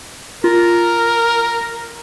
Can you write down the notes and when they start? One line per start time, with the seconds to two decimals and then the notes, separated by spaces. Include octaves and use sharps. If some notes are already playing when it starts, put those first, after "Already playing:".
0.44 F4 A#4